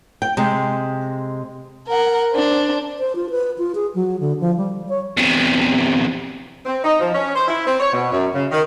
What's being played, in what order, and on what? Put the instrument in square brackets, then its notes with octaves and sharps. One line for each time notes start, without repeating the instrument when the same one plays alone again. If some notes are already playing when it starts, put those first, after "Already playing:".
[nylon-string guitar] G5
C3 G#3
[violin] A#4 F#5
D4 C5
[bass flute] C5
F4
B4
F4
G#4
F#3
D3
F3
G3
C#5
[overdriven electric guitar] E2 C3
[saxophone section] C4
D#4
F3
C#4
C5
E4
C4
C#5
B2
F#2
C#3
D#3